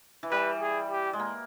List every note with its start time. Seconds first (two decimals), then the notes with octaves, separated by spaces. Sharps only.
0.23 E3
0.31 G3 B4
0.60 G#4
0.91 G4
1.13 G#3
1.20 A#3